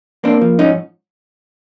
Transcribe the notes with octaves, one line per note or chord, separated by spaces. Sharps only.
A#3 C4 D4
F3
G#2 C#4 D#4